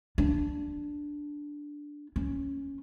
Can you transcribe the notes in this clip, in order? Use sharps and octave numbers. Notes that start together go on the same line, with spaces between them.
D4
C#4